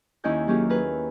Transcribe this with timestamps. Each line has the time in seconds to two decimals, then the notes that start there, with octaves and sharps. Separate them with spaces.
0.24 D#2 C#4 E4 D#5 G#5 G6
0.47 F#3 A#3 C#4 G4 G#4
0.70 G#4 A#4 B4